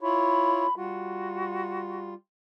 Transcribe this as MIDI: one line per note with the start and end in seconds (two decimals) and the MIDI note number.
0.01 0.67 64
0.01 0.67 65
0.01 0.67 73
0.01 0.76 83
0.76 2.14 55
0.76 2.14 65
0.76 2.09 66